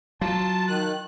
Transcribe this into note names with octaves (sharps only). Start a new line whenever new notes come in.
F#3 F4 A5
D#3 F#6